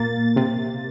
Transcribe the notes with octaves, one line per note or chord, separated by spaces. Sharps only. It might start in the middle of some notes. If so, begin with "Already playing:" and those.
Already playing: A#2 A#3 A6
C3